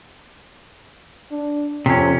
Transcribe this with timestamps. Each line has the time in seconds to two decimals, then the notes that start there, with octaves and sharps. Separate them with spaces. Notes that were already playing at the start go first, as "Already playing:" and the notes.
1.31 D4
1.86 F2 C3 C#4